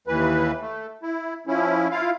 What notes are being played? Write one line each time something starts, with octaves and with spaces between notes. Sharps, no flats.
D#2 E3 B4
A3
E4
F3 C#4 E4
E4 F4 F5